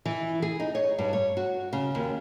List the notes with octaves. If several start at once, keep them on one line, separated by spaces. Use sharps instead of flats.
E3
G#4
D#4
C#5
G2
C#5
F#4
C#3
D#2